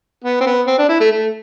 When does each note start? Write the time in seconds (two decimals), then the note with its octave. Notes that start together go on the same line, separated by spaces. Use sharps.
0.24 B3
0.41 C4
0.46 B3
0.67 C4
0.78 D4
0.89 E4
1.00 A3
1.11 A3